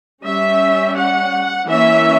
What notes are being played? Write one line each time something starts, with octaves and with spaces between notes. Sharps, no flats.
G3 C#4 E5
F#5
E3 A#3 C#4 E5